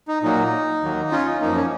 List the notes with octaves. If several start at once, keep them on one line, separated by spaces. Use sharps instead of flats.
D#4
A#2 F#3 A#3 D#4
D#2 D#3 F#3 A#3
C#4 F4
D#4
F#2 F3 A#3 D#4
C#4